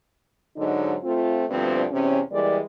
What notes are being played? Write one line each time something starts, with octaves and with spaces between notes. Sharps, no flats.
G#2 D3 F#3 D#4
A3 C4 F4
D2 G2 F3 B3 C4
E2 C3 C#4
E3 G3 G#3 A#3 D5